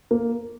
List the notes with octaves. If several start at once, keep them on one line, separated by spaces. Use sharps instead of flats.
A#3